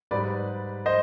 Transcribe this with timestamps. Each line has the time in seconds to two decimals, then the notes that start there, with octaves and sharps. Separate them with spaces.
0.11 G#2 G3 B4 D5
0.86 C5 D#5